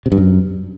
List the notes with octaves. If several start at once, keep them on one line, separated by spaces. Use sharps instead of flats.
C3
G2
F#2